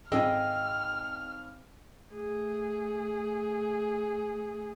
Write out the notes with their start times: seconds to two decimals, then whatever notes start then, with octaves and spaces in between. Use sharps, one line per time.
0.12 G#1 G#4 D#5 G5 E6 F6
2.12 A3 G#4